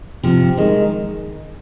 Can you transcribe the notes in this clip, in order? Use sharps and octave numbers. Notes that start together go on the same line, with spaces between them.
C3 F3
D#3 G#3